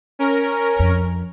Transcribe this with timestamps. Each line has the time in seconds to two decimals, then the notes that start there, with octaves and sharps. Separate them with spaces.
0.19 C#4 A#4
0.79 F2